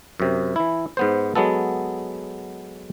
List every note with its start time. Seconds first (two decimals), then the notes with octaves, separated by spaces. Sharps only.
0.20 F#2 C3
0.56 E3 E4
0.97 G#2 B3 C5
1.35 F#3 G#3 B3 A4